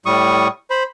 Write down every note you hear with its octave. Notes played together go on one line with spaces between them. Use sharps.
A2 G3 C#6 D#6
C5 B5